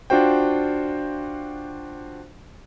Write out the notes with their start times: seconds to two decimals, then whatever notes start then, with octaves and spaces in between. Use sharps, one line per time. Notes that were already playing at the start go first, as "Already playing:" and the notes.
0.10 D4 F4 F#4 C5 G5